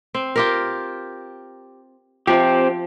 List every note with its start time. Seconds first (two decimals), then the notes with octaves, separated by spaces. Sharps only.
0.14 C4
0.36 F4 G4 A#4
2.27 F3 C4 G4